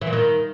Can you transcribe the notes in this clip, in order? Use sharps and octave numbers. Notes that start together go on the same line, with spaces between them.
E3
A#2
D#3